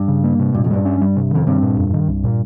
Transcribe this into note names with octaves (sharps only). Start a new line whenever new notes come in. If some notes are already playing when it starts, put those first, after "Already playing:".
Already playing: G2
C#3
A#3
C3
G2 A#2
F2
G2 G3
C#4
G3
C3
F2 D#3
G2 C4
A#2
F2
D#3
C2
A#2